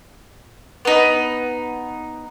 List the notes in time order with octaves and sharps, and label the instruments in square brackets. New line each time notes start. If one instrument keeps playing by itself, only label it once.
[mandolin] B3 D#4